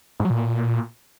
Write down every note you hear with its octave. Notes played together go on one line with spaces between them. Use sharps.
G#2
F#3
A#2